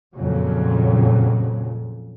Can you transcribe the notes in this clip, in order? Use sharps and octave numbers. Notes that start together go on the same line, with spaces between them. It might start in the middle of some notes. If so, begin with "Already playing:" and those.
F2 A#2 C#3 F#3